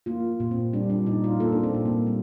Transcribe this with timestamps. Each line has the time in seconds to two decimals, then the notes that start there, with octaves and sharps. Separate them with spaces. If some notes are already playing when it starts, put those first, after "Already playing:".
0.06 A#3 F4
0.40 A#2
0.51 C4
0.73 G3 D4
0.90 D4
1.06 A#2 D#4
1.24 F4
1.40 A#3 A4
1.52 D4
1.63 C4
1.74 A#2
1.85 A#3
2.07 G3